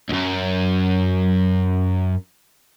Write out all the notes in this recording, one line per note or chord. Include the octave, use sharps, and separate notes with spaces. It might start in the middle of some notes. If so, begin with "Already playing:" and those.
C#2 F#2